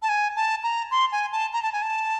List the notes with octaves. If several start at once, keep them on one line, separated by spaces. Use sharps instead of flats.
A5
G#5
A5
A#5
C6
G#5
A5
A#5
A5
G#5
A5